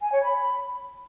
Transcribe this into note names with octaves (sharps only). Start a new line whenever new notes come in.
G#5
C#5
B5